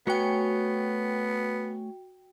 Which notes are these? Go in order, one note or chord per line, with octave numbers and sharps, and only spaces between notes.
A3 B3 F#4 C#5 G5 G#5